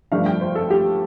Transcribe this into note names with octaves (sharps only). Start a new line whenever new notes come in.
G2 F3 A3 D4 F5
G5
C5
A4
G4